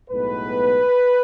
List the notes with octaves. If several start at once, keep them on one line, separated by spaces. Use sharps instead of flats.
B1 A2 G#3 B3 B4